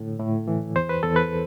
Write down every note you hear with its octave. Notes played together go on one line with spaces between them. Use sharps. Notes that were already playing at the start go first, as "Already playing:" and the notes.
Already playing: A2 D3
A2
E3
E2 C5
B4
E2 A4
B4